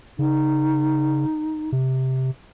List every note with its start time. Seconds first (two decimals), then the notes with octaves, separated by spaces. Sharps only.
0.19 C#3 D#4
1.72 C3